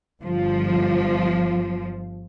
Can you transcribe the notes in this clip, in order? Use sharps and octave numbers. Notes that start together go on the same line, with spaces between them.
G1 F3